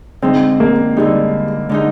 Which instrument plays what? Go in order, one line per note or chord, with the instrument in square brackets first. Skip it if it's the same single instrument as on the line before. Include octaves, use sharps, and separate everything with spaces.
[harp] D3 G#3 D#4 [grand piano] C4
[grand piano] A#3
[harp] D3 G#3 D#4 [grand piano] G3
[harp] D3 G#3 D#4